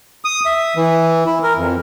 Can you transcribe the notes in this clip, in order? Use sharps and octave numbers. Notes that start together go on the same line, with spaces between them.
D#6
E5
E3
E4
A#4
F2